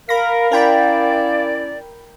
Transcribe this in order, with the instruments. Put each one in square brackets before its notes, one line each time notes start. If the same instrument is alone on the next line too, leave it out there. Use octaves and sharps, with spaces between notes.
[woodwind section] A#4 [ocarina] F5 [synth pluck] B5 A#6
[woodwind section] C#4 E4 D5 [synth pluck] A#4 G5 B5